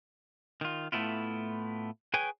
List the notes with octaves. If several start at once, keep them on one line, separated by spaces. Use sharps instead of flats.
D#3 F4
A2 A3 B3 E4 F4
G#4 B4 C#5 G5 G#5